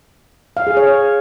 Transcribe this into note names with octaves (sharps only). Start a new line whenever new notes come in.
F5
G#4
C#5